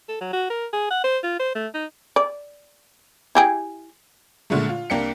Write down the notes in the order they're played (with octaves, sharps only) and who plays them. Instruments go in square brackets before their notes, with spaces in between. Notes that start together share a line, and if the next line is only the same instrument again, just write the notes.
[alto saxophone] A4
F#3
F#4
A#4
G#4
F#5
C5
F4
C5
A3
D#4
[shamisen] D5
E4 G4 G#4
[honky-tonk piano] A#2 D3 G#3 A3
F4
C2 A#3 D4 G5 C#7